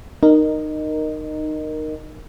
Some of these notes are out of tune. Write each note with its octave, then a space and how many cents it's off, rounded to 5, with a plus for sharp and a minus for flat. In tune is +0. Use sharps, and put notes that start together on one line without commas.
D#4 -20 A#4 +0 D#5 -10